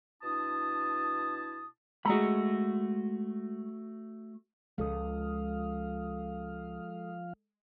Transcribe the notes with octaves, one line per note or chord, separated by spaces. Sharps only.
B2 D4 E4 A5 D#6
G#3 A3 F#4 A#5 B5
C#2 C#3 F3 G#3 A4 F5 D#6